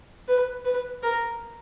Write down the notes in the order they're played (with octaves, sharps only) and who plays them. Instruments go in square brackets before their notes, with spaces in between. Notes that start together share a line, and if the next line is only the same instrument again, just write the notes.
[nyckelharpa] B4
B4
A#4